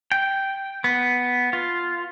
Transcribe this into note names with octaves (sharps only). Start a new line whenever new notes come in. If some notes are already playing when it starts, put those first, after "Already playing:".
G5
B3
F4